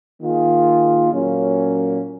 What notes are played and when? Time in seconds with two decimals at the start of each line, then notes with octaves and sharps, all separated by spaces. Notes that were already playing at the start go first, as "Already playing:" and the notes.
0.21 D#3 A#3 F4 G#4
1.13 A#2 F#3 A#3 C#4